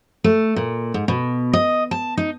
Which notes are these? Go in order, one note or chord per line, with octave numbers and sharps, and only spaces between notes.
A3
A#2
G#2
B2
D#5
A5
D#4